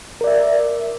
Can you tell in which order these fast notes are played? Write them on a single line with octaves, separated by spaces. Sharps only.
A#4 D5 E5